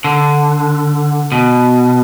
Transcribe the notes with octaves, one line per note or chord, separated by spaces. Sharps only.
D3
B2